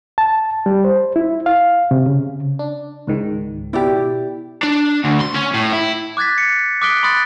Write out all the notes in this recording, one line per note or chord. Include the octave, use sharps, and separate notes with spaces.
A5
G3
C5
E4
F5
C3
C#3
D4
C#2 G#2 D#3
B2 E4 G4 D5
D4
D2
C6
C#4
A2
E4
D6 F#6 G#6 A6 B6
C#7
D6 D#6 F#6 B6 D7 G7
B5 C6 D#6 F#6 A6